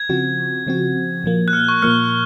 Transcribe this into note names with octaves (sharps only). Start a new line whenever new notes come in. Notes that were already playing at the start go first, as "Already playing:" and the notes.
Already playing: G#6
C#3 F3 C4 F#4
C#3 F3 C4 F#4
A#2 F3 A#3
F#6
F6
C#6
A#2 F3 A#3 F6